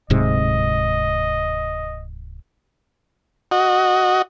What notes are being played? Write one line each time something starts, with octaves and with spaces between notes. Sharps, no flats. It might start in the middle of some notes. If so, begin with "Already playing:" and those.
D1 G#2 C3 D#5
F#4 D#5